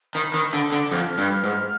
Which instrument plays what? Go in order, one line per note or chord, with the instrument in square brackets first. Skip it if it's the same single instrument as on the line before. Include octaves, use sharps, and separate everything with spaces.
[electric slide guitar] D#3 [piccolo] B5
[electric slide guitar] D#3
[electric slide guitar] D3 [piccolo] D6
[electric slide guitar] D3
[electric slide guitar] F2 [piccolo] F6
[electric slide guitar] G2
G#2